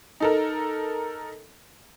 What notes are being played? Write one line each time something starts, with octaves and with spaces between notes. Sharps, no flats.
D#4 A4 A#4